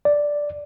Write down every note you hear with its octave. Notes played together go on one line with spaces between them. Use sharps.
D5